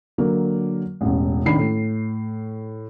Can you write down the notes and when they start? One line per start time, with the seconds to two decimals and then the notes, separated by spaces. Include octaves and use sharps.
0.18 D3 F#3 A#3
1.01 E1 A1
1.45 A1 D#3 D4 B5 C7
1.58 A2